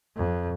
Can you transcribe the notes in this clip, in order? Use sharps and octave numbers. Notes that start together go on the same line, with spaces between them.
F2